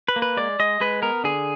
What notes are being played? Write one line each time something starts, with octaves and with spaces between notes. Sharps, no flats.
B4
A#3
B4
G#3 D5
G#3 D#5
G#3 B4
B3 A#4
D3 G#4